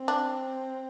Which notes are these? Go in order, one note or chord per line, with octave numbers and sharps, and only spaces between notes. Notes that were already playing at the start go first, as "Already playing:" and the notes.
Already playing: C4
D4